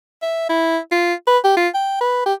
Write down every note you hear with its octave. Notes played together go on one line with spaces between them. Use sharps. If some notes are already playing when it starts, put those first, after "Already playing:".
E5
E4
F4
B4
G4
F4
G5
B4
G4